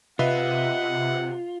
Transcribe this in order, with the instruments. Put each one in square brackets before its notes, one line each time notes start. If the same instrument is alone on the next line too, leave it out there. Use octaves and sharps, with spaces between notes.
[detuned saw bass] C3 [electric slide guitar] F4 [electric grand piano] B4 D#5 E5 [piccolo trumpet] F#5